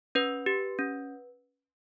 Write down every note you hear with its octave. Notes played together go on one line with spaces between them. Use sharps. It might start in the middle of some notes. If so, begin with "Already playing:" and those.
C#4 B4
G4
C#4